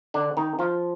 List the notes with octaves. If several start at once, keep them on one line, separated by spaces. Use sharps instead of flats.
D3 D4
D#3 D#4
F3 F4